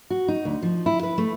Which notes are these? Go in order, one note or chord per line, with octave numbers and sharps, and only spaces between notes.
F#4
D#4
D2
F3
E4
B4
A3